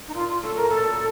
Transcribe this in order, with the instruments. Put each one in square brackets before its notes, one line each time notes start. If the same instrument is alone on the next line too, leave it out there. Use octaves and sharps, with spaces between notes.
[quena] D#4
[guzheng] A#2 [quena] F4
[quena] F4
[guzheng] F#3 A3 C#4 [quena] A4
[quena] A#4
[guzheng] A#2 [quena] A4